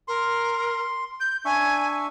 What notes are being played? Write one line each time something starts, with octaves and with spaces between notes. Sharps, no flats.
A#4 C6
G6
D4 E5 G#5 C#6